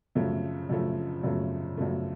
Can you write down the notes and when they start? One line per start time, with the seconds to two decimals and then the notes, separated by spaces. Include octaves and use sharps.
0.15 F#2 C#3 F3 A3
0.69 F#2 C#3 F3 A3
1.23 F#2 C#3 F3 A3
1.77 F#2 C#3 F3 A3